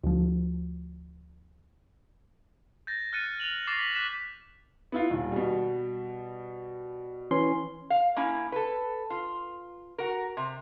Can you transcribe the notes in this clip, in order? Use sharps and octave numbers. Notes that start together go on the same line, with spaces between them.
D2 F3
G6 A6 A#6
F6 F#6 A6 C#7 D#7
F6 D#7 F7 F#7
C#6 D6 A6 A#6 C7
B6 F#7
F#6 B6 E7
B3 E4 F4
D#1
B2 G3
E3 C#4 C6
F5
A#3 C#4 E4
A4 B4
F4
F#4 A#4
C3